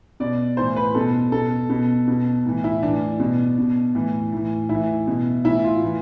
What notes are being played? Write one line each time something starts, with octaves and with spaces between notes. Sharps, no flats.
B2 D5
A2 E3 C5
B4
B2 A4
B2 A4
B2
B2
A2 E3
E4
A2 E3 D4
B2
B2
A2 E3
A2 E3
A2 E3 E4
B2
A2 E3 E4
F4
A2 E3